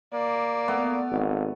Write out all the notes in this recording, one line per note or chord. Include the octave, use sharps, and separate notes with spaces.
A#3 D5
A3 B3
G#1